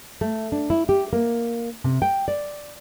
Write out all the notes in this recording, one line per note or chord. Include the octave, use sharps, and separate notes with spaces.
A3
D4
E4
G4
A#3
C3
G5
D5